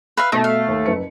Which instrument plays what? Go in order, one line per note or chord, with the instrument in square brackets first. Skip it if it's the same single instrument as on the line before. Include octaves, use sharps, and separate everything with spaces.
[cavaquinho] B4 E5 F5
[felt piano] B2 A4 [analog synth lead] A3 [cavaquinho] D#4
[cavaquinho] F5
[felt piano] D#2
F#1 B4 C#7